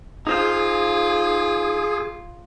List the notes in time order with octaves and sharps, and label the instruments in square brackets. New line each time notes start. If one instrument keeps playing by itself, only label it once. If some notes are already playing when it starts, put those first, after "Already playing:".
[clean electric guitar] D#4 C5 F5 [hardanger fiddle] F4 [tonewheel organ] G#4